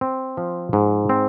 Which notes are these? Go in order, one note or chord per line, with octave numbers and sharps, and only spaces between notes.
C4
F3
G#2
C4